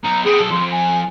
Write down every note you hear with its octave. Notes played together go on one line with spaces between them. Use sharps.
B1 D#4 A#5
B3 C4 G#4
B1 A4
F2 C6
G#5